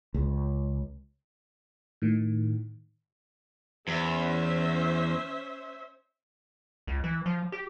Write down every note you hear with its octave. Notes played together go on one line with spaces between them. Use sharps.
C#2
A2 D#3
E2 C#4 C5 E5
C#2
E3
F3
G4